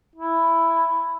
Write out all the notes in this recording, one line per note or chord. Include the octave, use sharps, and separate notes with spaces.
E4